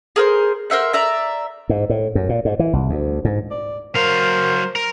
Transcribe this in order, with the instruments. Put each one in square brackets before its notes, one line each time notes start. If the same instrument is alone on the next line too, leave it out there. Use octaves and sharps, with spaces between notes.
[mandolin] G#4 A#4 C5
A#4 C5 E5 F#5
D5 E5 A#5
[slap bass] G#2
A2
F#2
A#2
G#2
E3
C2
D2
G#2
[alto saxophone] D5
[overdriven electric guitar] F#3 F5 [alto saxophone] A#4 [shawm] C5
[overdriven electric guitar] A#4